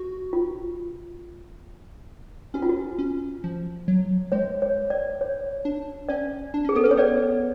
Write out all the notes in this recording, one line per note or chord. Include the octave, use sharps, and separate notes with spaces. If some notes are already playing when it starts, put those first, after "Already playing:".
Already playing: F#4
F4
C#4 F#4
F4
F#4
C#4
F3
F#3
G#3 C#5
C#5
D5
C#5
D4
C#4 D5
D4
C#4 G#4
B3 A4
C#4 B4
C#5
B3 D5